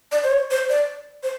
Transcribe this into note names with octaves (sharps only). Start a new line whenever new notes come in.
D5
C5
C#5
C5
D5
C5